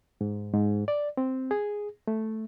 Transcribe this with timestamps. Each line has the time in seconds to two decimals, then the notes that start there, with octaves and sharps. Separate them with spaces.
0.21 G#2
0.54 G#2
0.88 D5
1.17 C4
1.51 G#4
2.07 A3